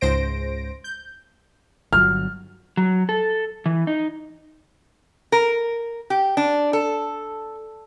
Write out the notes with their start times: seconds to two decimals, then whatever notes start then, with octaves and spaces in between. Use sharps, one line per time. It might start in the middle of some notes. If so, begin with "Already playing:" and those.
0.01 C#2 G#2 C5 A#6 D7
0.84 G6
1.93 G1 F#3 F6
2.77 F#3
3.09 A4
3.66 E3
3.87 D#4
5.32 A#4
6.10 G4
6.37 D4
6.73 A4